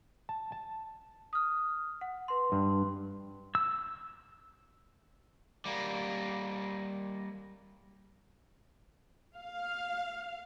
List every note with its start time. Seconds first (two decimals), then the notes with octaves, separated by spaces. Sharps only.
0.29 A5
0.52 A5
1.33 D#6 F6
2.01 F#5
2.28 B4 C6
2.52 G2
3.55 E6
5.65 G3 A#3
9.40 F5